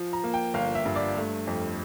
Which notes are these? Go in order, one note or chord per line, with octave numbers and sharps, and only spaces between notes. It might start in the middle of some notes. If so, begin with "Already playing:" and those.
Already playing: F3
A#5
A#3
G5
G1 F5
E5
G2
D5
A3
F2